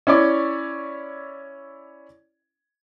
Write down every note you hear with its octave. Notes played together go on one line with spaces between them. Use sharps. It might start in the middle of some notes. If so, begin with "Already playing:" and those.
C#4 E4 C#5 D5